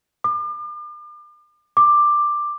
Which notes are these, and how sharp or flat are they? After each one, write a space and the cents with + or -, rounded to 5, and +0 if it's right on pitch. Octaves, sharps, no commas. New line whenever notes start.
D6 +40
D6 +10